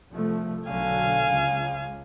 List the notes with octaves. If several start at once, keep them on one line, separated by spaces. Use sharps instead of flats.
C2 F3 A3
B1 D3 F#3 F5 G#5
C#2